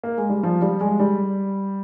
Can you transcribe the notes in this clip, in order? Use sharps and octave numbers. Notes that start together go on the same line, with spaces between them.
A#3
G#3
G3
F3
G3
G#3
G3